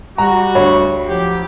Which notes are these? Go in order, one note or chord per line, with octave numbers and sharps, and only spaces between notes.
G3 F#4 A#5
D2 C#5 B5
F3 F#3 G4